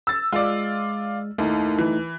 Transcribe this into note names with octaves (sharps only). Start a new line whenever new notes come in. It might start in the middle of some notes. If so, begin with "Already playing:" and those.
E6 A6
G#3 F4 D5
D#2 A3 D#4 E4
E3